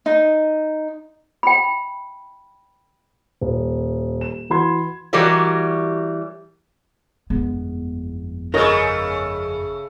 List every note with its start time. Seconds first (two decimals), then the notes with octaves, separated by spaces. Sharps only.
0.06 D#4
1.43 G5 B5
3.41 D#1
4.21 E7
4.50 E3 F#4 B5 C6 G#6
5.13 E3 G3 F#4 G4 A#4 C#5
7.30 G1 F2 A2 G#3 B3
8.54 C#3 A3 A#4 C#5 D#5